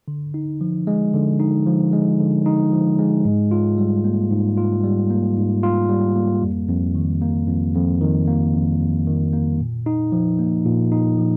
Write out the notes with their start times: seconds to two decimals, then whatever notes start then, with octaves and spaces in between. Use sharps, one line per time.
0.08 D3
0.34 D#4
0.61 F3
0.87 G#3
1.14 D3
1.40 D#4
1.66 F3
1.93 G#3
2.20 D3
2.46 D#4
2.72 F3
2.99 G#3
3.25 G#2
3.51 F4
3.78 G3
4.04 A#3
4.31 G#2
4.57 F4
4.84 G3
5.10 A#3
5.36 G#2
5.63 F4
5.89 G3
6.16 A#3
6.42 F2
6.69 F2
6.95 D#3
7.22 A#3
7.48 F2
7.75 F2
8.01 D#3
8.28 A#3
8.54 F2
8.80 F2
9.07 D#3
9.33 A#3
9.60 A#2
9.86 D#4
10.12 F3
10.39 A#3
10.65 A#2
10.92 D#4
11.18 F3